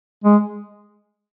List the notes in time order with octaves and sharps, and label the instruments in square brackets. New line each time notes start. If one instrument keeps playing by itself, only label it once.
[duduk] G#3